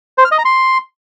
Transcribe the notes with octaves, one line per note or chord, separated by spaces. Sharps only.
C5
F6
D#5
A#5
C6